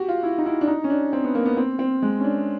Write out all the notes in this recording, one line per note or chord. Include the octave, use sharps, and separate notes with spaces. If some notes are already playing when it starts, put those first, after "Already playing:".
Already playing: F#4 G4
F4
E4
D#4
E4
D4
D#4
C#4
D4
C4
B3
A#3
B3
C4
C4
G#3
C#4
D4